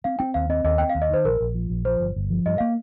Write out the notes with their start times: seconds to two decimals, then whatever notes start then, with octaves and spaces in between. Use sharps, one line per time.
0.04 C4 F5
0.19 C4 G5
0.34 D#2 F5
0.49 C4 D#5
0.64 D#2 D#5
0.78 C4 G5
0.90 F5
0.95 D#2
1.02 D#5
1.10 D#3 C5
1.24 A#1 A#4
1.40 A#1
1.55 F3
1.70 A#1
1.85 F3 C5
2.00 G1
2.16 G1
2.30 F3
2.46 G2 D#5
2.58 A#3 F5